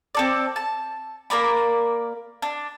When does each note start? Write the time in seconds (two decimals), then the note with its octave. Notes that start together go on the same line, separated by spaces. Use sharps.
0.15 C4 A4 D5
0.56 A5
1.30 A#3 A#4 D5 B5
2.42 D4